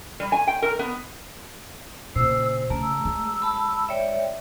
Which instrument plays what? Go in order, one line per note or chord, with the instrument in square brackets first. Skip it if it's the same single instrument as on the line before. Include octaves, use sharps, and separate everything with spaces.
[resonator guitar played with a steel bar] G3
G#5
G5
A#4
B3
[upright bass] A#2 C#3 [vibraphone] C5 [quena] E6
[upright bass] C#3 [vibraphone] A3 A#5 [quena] A5
[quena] E6
[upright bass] G#3
[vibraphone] A5 B5
[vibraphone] C#5 D5 E5 [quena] G5